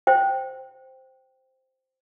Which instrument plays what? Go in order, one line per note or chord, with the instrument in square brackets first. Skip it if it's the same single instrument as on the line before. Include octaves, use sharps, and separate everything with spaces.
[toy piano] C5 G5